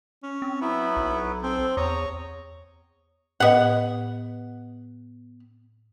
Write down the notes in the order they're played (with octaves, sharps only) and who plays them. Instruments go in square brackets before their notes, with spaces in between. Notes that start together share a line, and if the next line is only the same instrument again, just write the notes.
[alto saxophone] C#4
[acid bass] C4
[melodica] F#3 B3 B4 [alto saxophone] E4
[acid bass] B1
[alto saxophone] C4 [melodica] A4 C5
[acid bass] E2 [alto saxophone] C#5 [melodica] A#5 D#6
[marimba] A2 D#5 [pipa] B3 F#5